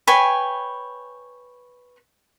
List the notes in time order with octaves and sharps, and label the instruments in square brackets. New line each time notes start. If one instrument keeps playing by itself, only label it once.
[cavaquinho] B4 C#5 G5 G#5